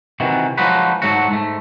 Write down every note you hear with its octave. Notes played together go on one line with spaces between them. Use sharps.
C3 D#3 E3 F#4
F3 F#3 G#3 D#4 F#4 B4
G#2 F#3 A3 F#4
G#2 A3